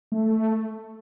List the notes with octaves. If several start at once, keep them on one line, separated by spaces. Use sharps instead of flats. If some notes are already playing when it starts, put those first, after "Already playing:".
A3